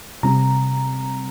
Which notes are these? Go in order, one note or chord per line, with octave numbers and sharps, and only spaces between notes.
C3 G3 C4 A#5